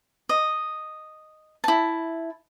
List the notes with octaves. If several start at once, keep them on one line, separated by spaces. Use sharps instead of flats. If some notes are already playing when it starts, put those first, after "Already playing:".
D#5
E4 A5